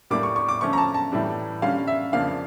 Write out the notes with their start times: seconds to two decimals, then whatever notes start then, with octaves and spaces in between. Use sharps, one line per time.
0.10 A2 G3 A#3 D4 D6
0.23 C#6
0.36 C#6
0.48 D6
0.61 D3 F3 A3 C#4 C#6
0.73 A#5
0.78 A5
0.94 A5
1.12 A2 E3 G3 D4
1.62 D3 G3 C#4 F5
1.87 E5
2.13 F2 C#3 F3 A#3 D4 F5